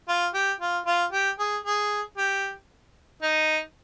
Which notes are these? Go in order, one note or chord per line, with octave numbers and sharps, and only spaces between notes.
F4
G4
F4
F4
G4
G#4
G#4
G4
D#4